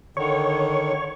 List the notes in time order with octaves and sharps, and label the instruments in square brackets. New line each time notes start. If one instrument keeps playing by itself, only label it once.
[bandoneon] D3 D#3 [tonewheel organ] C#5 C#6